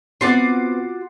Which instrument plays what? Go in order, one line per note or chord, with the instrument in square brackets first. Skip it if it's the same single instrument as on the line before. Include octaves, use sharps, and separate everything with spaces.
[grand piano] B3 C4 [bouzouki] F4 F#4 F#5 [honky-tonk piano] D6 A6 C7